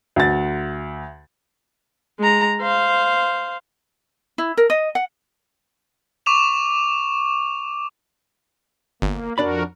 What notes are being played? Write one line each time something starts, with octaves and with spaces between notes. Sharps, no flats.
D2 A6
G#3 A#5
C5 F5
E4
A#4
D#5
F#5
C#6 D6 E7 F7
G1 A#3
F2 D4 F#4 A#4 D5 B5